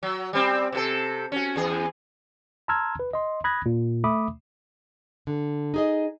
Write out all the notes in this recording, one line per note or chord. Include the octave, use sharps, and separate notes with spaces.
F#3
G3 C4
C3 B3 A4
C#4 F#4
E2 G#4
A5 A#5 C6 E6 F6 G#6
B4
D#5 C6
B5 D#6 F#6 G#6 A#6
A#2
A3 E5 B5 D6 D#6
D3
D#4 G#4 D#5